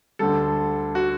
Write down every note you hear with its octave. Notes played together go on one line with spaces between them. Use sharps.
D2 D3 G3 A4
F#4